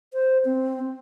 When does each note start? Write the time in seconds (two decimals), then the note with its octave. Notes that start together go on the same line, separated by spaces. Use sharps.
0.13 C5
0.45 C4